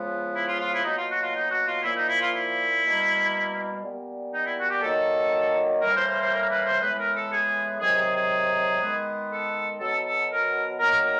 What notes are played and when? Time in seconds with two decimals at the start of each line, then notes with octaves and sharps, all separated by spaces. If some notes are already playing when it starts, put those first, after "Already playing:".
Already playing: C#3 F3 G#3 B3
0.34 E4
0.46 F4
0.58 F4
0.71 E4
0.83 B2 F#3 A#3 D#4
0.96 F4
1.09 F#4
1.21 F4
1.33 D#4
1.50 F#4
1.66 F4
1.83 A#2 F3 A#3 E4
1.95 D#4
2.08 E4
2.21 F4
2.33 E4
2.83 B2 G3 A#3
3.82 A#2 G3 B3
4.32 D#4
4.45 E4
4.57 F#4
4.70 G4
4.82 D#3 F#3 A#3 A4
5.82 A2 E3 G3 A#3 A#4
5.94 C5
6.07 C5
6.19 C5
6.31 A#4
6.48 B4
6.64 C5
6.81 A2 E3 G#3 B3 B4
6.98 A#4
7.15 A4
7.31 G#4
7.81 C3 D#3 F#3 G#4
7.98 G#4
8.14 G#4
8.80 D#3 G#3 B3
9.31 A4
9.80 B2 F#3 B3 A4
10.05 A4
10.30 A#4
10.80 D#3 F#3 A#3 A#4
11.04 A#4